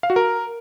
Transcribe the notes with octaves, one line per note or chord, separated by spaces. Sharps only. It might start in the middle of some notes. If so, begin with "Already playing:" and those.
F5
F#4
A#4